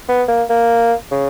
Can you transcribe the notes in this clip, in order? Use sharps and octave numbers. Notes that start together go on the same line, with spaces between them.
B3
A#3
A#3
C#3